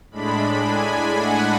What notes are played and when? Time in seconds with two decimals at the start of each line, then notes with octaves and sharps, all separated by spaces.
0.11 A2 G#3 D4 B5
0.64 G#5
1.16 F#5